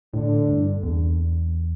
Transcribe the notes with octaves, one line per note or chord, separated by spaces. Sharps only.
A2 D3
G2
E2